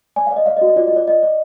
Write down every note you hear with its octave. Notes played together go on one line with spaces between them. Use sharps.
D5 G#5
F5
D5
D#5
D5 F5
D#5
F#4
D#5
F4 D5
D#5
F4 D5
D5 D#5
D5